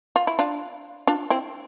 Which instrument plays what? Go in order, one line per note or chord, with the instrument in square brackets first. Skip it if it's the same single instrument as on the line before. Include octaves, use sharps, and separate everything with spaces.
[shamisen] F4
E4
D4 F4
D4 F4
C4 E4